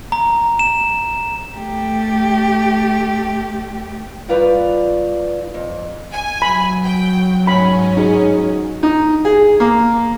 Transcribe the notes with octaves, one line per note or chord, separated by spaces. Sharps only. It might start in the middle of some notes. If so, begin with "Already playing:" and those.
A#5
E7
A3 G4
D#3 G3 F4 B4 D5
F2
G#5
F#3 B5
G5
G#2 C#4 B5
D#4 F#4 G#4
D#4
G#4
A#3